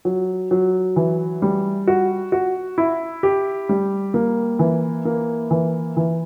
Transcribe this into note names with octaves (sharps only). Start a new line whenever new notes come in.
F#3
F#3
E3
G3
F#4
F#4
E4
G4
G3
A#3
E3
A#3
E3
E3